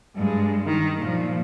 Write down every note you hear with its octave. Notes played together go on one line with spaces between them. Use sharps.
G2 G#3
D#3
A#2 F3